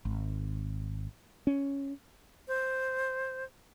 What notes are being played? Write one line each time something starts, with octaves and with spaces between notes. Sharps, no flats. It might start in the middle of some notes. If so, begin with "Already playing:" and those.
G#1
C#4
C5